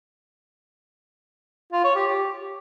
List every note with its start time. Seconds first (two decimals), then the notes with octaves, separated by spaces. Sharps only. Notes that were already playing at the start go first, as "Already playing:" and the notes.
1.73 F4
1.84 C#5
1.96 G4
2.07 G4